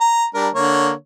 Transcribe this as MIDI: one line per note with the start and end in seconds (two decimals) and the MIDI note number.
0.01 0.26 82
0.34 0.49 55
0.34 0.49 62
0.34 0.49 70
0.55 0.92 50
0.55 0.92 58
0.55 0.92 73